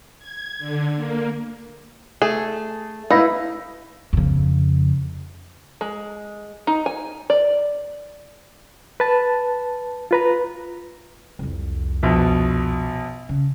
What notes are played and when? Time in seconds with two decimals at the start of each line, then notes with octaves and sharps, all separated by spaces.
0.19 G#6
0.59 D3
0.96 A#3
2.22 A3 G#4
3.10 D#4 E4 B4 F5 A#6
4.13 F2 C#3
5.81 G#3
6.67 D#4
6.86 G#5
7.30 D5
9.00 B4 A5
10.11 F4 B4 A#5
11.39 C2 F2
12.03 A#1 B2
13.29 C#3